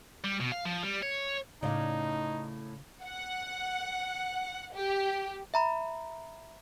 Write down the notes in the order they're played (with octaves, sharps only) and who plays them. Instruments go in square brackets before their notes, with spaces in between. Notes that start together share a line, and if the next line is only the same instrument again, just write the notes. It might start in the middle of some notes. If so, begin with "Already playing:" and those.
[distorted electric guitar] G3
B2
F5
F3
G3
C#5
[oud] A2 D5 [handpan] C#3 F5 [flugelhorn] D#4
[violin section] F#5
G4
[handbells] E5 A#5 B5